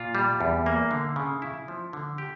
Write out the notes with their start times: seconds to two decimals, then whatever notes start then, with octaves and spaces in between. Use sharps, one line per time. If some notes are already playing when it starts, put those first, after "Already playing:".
Already playing: A#2 F4
0.15 G3
0.40 E2
0.66 A#3
0.91 D3
1.16 C#3
1.42 E4
1.68 F3
1.93 D3
2.18 G4